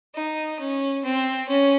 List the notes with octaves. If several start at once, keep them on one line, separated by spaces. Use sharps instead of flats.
D#4
C#4
C4
C#4